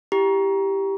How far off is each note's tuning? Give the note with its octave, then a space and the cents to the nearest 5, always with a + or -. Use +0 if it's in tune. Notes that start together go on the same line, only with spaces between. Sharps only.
E4 +10 G4 +0 A#5 +20